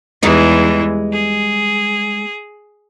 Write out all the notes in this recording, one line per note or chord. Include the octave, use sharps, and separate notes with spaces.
E2 E3 G3 G#3 D#4
G#4